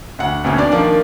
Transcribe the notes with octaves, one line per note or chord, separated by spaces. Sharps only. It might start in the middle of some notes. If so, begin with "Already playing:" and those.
D2 F#5
D2 B2 C4 C#4
D4 D5
D#3 F3 A#3 D4